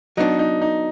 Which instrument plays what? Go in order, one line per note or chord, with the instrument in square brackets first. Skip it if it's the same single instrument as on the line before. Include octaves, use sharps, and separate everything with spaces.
[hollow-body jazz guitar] F#3 B3 D4 [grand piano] D#4
[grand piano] D#4
D#4